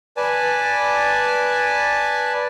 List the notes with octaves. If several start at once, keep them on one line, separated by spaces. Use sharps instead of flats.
B4 D5 G#5 A5